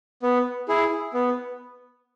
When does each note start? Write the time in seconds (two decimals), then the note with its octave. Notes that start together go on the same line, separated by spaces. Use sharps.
0.22 B3
0.68 E4 G#4
1.13 B3